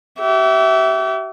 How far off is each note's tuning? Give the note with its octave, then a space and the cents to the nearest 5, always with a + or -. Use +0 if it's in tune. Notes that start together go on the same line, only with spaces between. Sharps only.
G4 -45 E5 -5